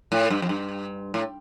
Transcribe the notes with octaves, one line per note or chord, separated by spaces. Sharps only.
A2
G2
F2
G2
A2